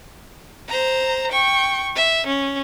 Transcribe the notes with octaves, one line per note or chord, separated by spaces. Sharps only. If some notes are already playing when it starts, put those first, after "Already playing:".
C5 A#5
G5 C#6
E5
C#4